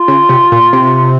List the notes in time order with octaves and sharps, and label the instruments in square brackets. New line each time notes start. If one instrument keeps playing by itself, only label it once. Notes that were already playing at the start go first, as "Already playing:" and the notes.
Already playing: [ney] F4
[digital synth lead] C#3
C3
A#2
C3